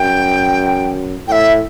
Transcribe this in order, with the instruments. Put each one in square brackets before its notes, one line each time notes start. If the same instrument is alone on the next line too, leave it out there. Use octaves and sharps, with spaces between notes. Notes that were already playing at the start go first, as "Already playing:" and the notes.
Already playing: [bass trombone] F#2 [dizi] G5
[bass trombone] A2 [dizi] E5 G5